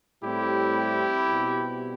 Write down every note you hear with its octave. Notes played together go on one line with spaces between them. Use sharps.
A2 G3 C4 E4 G4
B2 G3 C4